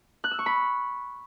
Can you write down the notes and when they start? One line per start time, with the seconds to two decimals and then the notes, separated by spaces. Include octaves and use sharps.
0.24 F#6
0.31 E6
0.39 C#6
0.46 B5